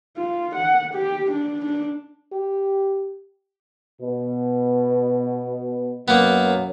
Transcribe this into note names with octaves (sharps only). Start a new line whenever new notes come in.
F4
F#5
G4
D4
D4
G4
B2
F#2 F#3 A#3 B3